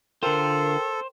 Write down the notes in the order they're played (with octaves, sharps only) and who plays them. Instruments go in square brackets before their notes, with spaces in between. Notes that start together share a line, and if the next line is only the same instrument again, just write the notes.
[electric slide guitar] D3 F4 [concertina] A4 [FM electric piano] A#4 G5 [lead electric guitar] C5